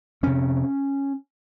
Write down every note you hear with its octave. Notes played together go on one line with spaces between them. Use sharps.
F2 C3 C#4